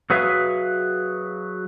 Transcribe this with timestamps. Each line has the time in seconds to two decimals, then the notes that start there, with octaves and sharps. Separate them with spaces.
0.10 F#3 F#4 G#4 B4 E5 F5